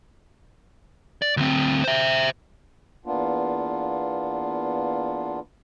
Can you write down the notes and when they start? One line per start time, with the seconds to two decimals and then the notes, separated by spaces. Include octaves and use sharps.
1.22 D5
1.37 D2 C4
1.84 C5 E5
3.06 E2 A#3 B3 D4 F4